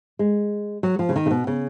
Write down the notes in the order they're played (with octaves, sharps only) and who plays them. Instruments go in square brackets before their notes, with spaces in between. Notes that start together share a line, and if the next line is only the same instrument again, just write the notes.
[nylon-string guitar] G#3
F#3
F3
C#3
D#3
C#3
B2
C#3